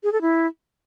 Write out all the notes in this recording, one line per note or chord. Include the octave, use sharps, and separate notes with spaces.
G#4
A4
E4